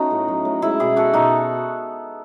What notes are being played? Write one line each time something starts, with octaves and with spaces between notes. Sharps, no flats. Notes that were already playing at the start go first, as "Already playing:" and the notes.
Already playing: A3 B3 C#4 D#4 F#4 C#5
A2
F#3
A2
G#3 E4
B2 E4 G#4
B3 F#4 A4
B2 D#4 F#4